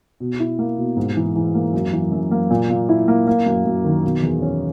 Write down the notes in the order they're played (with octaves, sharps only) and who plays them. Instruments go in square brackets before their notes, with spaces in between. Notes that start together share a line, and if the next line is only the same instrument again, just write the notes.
[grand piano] B2
E4
A#3
B2
G#2
E3
E3
A#3
F#2
E3
F#2
A#3
A#2
A#2
E4
A#3
A#3
F#2
F#2
D#3
B2
E2
C#4